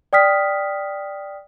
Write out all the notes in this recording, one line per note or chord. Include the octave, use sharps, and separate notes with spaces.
D5 G5 D#6 F6 B6